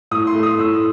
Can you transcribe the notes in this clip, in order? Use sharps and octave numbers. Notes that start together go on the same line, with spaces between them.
A2 D#6
C6
A3
D#6
A2 E6